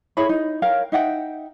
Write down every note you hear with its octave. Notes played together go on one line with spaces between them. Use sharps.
E4 G#4 C#5 B5
D#4
A#4 C#5 F5 G5
D#4 E5 F#5 G5